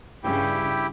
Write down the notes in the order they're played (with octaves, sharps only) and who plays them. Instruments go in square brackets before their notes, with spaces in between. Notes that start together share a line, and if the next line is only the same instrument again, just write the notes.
[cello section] G2 C#3 [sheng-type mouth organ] E4 G4 G5